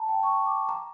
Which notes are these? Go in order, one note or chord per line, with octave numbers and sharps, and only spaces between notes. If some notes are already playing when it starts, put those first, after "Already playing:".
Already playing: A5 A#5
G5
C#6
D6
A#5